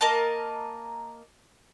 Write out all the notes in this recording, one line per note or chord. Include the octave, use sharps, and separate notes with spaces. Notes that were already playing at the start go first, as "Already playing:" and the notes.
A#3 A#4 D#5 A5